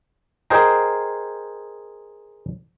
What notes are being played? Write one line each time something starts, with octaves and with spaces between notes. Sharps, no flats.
G#4 A#4 C5 D#5 G5 A#5